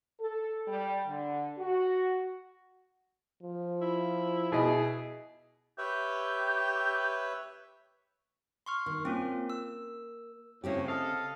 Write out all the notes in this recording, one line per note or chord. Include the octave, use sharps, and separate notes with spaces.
A4
G3
D3
F#4
F3
E4
B2 E4 G#4 D#5
G4 B4 C#5 E5
C6 C#6 F6
D#3
A#3 C4 C#4 F4
E6
A2 C#3 C4 G4
A4 D#5 F5